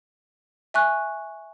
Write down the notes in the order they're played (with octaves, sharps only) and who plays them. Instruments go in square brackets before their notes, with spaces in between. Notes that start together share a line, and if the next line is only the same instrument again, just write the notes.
[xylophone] E5 G#5 C#6 F#6